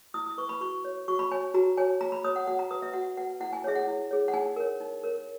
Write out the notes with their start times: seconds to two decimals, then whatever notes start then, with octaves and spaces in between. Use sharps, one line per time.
0.14 E4 D#6
0.26 D#6
0.38 B4 C#6
0.49 B5
0.61 F#4 C#6
0.84 C#5
1.08 F#4 C#6
1.19 B5
1.31 C#5 G#5
1.54 F#4 A#5
1.77 C#5 G#5
2.01 F#4 A#5
2.12 B5
2.24 C#5 D#6
2.36 F#5
2.47 F#4 F#5
2.59 A#5
2.71 B4 D#6
2.82 E5
2.93 F#4 F#5
3.17 B4 F#5
3.40 E4 F#5
3.53 G#5
3.64 G#4 C#5 E5
3.75 F#5
3.87 E4
4.11 G#4 C#5
4.28 F#5
4.33 D#4 G#5
4.56 A#4 C#5
4.80 D#4
5.04 A#4 C#5